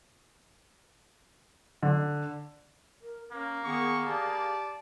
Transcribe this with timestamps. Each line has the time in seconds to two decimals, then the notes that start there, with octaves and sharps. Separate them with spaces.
1.83 D3
3.01 A#4
3.32 A#3 C#4
3.65 D#3 B3 G#4 C#6
4.06 G4 D5 F5 A5